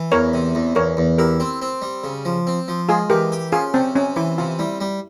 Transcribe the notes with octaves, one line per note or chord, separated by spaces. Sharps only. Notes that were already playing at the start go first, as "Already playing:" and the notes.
Already playing: E3
E2 A#4 C#5
C3
E2
E2 A#4 C#5
E2
E4 G4 A#4
C4
C4
G3
C#3
F3
C4
F3
G#3 F4 G#4
E3 G4 A#4
G4
C#4 F4 G#4
C3 C4
C3 C#4
E3 E4
C3 F4
G3 E4
G3